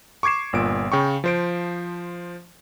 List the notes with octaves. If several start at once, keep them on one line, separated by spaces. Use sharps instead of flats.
C#6 D6 G#6 C7 E7
G1 A#2 D7
C#3 G5 C#6
F3 C5 D7